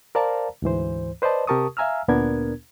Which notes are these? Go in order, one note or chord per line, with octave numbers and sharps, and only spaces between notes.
A#4 C5 D5 F5 A5 A#5
D2 G#2 E3 C5
B4 C5 D5 D#5 A5
C3 G4 A#4 A5 C#6 D#6
E5 F5 G#5 A#5 E6 F6
D2 A#2 B3 D4 A#4 G#6